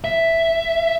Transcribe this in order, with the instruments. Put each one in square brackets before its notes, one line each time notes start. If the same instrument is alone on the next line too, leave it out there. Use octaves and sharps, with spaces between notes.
[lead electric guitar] E5